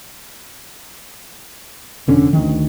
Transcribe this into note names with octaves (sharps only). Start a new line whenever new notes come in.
F1 D3 C#4
D2 D#3